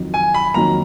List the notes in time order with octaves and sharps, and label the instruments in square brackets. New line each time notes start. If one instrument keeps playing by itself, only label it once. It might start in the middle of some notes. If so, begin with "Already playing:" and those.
Already playing: [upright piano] F2 D#3 F#3
[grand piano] G#5
B5
[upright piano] F2 D#3 F#3 A#3 [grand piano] A#5